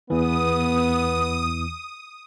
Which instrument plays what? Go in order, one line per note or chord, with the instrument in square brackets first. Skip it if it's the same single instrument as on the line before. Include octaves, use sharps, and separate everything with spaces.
[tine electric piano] E2 E3 [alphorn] B3 [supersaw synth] D#6